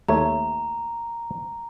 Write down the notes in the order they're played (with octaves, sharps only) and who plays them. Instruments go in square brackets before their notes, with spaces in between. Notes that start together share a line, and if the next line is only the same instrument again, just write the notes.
[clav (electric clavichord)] D#2 A3 C#5 [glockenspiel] A#5